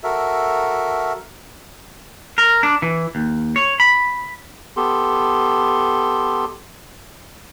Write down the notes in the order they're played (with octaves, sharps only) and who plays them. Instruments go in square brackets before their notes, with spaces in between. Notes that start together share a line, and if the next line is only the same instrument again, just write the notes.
[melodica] F#4 A4 A#4 E5
[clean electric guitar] A#4
D4
E3
D#2
C#5
B5
[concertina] B3 G4 A4 C6